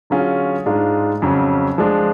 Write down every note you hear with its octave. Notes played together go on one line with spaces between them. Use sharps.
D3 F#3 C#4 F4 G#4
G#2 G#3 D4 F4
F2 C#3 F#3 C#4
F3 G#3 D4